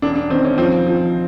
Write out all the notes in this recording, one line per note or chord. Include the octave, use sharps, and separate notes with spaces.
E1 D4
D4
D#3 C4
C#4
F3 C4
F3